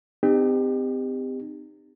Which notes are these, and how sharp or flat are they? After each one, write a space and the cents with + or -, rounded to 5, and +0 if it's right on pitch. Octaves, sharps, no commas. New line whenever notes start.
C4 -35 D#4 -35 G4 +25